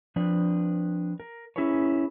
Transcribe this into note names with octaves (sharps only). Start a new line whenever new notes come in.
F3 C4 D4 B4 D5
A#4
C#4 E4 G#4 A#4 B4 C#5